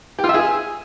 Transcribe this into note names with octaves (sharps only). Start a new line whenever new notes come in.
G4
F4
E5
G#4